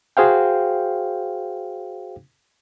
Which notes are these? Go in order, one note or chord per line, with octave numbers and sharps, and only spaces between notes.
F#4 G#4 C5 F5 G5